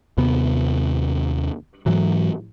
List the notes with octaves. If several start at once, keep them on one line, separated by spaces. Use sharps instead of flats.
D#2 C3 B3
G#2 E3 F#3